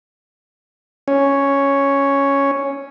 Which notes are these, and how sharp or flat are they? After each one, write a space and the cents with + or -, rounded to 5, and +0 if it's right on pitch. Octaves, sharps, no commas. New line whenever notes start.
C#4 +0